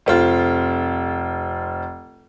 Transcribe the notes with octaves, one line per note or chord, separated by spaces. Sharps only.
F1 C4 F4